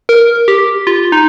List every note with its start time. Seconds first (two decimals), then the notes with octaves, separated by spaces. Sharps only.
0.09 A#4
0.48 G4
0.87 F4
1.12 D#4